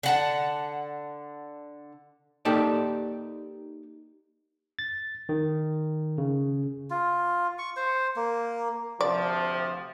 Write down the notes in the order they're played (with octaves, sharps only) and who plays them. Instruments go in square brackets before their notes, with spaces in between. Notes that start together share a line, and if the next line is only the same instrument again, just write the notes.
[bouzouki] D3 F#5 A5
[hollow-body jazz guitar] A#3 D#4 G4 A4 D5
[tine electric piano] A6
D#3
C#3
[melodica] F4
C#6
C5
A#3
[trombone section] D2 C3 F3 [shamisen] D5